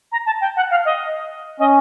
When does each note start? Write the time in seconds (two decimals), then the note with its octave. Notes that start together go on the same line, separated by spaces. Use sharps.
0.12 A#5
0.26 A5
0.41 G5
0.56 F#5
0.71 F5
0.85 D#5
1.59 C#4 D#5